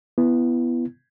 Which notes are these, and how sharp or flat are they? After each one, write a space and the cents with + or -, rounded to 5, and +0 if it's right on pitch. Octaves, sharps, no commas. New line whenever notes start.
B3 +0 E4 +25